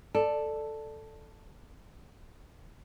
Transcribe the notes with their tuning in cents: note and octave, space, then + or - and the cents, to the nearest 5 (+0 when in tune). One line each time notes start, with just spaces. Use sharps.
A4 +0 D5 +10